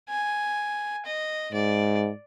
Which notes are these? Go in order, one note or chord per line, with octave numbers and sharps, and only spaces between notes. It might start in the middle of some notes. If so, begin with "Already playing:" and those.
G#5
D#5
G#2 D5